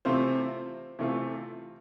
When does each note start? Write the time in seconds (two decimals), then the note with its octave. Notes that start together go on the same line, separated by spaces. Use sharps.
0.05 C3 E3 A3 C4 F4 C5
0.99 C3 E3 A3 C4 F4